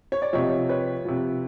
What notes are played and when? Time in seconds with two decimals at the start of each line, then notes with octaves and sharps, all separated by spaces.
0.12 C#5
0.22 D5
0.33 C3 F3 C#5 D#5
0.69 B4 C#5
1.05 C3 F3